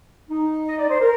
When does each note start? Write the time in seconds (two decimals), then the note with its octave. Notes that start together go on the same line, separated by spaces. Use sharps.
0.30 D#4
0.67 D#5
0.79 D5
0.90 C5
1.01 A#4